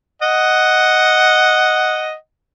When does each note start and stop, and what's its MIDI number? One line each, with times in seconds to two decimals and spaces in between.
0.22 2.13 75
0.22 2.13 78